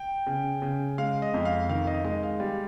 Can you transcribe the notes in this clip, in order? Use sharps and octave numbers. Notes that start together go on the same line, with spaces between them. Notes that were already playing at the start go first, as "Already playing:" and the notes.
Already playing: G5
C#3
C#3
G#3 F5
D#5
F2
F5
D#3 F5
D#5
G#3 D#5
F5
G3